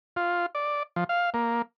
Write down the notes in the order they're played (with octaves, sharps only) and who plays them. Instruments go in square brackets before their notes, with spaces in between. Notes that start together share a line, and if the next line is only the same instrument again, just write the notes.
[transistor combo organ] F4
D5
F3
F5
A#3